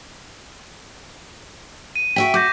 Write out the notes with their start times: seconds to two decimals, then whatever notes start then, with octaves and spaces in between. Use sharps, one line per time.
1.96 D#7
2.16 F#4 E5 G5 B6
2.34 F#4 D6 G6 A#6